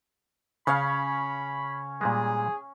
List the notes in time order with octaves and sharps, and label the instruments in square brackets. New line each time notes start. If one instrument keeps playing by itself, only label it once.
[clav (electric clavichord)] C#3 [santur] C#4 C#5 F5 [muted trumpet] B5
[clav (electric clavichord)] A#2 G3 G#3 [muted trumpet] G#4